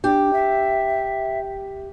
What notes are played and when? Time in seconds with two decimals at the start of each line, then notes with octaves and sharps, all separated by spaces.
0.04 D4 G4
0.33 E5